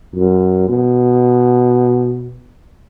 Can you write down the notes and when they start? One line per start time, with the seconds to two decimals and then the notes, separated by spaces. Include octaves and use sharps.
0.15 F#2
0.69 B2